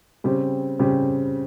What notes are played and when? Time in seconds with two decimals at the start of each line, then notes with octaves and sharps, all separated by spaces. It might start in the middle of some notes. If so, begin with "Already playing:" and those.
0.24 C#3 G3 C4 G4
0.79 C#3 G3 C4 G4